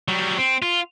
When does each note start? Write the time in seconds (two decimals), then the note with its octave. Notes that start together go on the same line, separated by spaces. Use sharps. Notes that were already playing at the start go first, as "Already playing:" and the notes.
0.08 F#3 G3
0.38 C4
0.62 F4